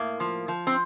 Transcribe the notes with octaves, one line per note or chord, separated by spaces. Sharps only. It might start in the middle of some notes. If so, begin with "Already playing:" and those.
Already playing: A2 A#3
F3
F3
C4